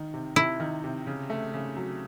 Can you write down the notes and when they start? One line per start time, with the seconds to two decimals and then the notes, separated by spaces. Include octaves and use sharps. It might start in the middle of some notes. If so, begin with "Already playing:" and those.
Already playing: D#3
0.14 C3
0.36 C3 E4
0.60 D#3
0.84 C3
1.07 C#3
1.30 A3
1.54 C#3
1.77 F#3